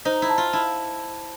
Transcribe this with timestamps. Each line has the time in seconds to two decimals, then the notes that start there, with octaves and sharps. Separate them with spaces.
0.05 D#4 C5
0.22 E4
0.29 A5
0.38 F4
0.53 E4 A5